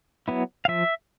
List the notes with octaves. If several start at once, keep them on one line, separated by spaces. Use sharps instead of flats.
F#3 B3 E4
F5
F3 E5